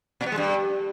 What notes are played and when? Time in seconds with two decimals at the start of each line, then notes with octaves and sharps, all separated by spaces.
0.21 A#2
0.26 B3
0.32 G#3
0.38 G2